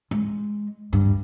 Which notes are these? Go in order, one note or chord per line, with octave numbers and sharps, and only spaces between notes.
G#3
G2